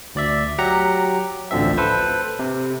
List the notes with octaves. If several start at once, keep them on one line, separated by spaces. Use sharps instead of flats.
D2 D5 E5
F#3 G4 F#5 A#5
A1 D2 D3 F3 C4 E5
A4 B4 C5
C3